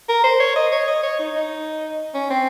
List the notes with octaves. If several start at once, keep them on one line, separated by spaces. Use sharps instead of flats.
A#4
C5
C#5
D#5
C#5
D#5
C#5
D#4
D#4
C#4
C4